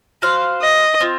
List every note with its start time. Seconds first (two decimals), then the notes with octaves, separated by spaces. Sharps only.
0.22 F#4 C5 F5
0.62 D#5
1.00 C4 F4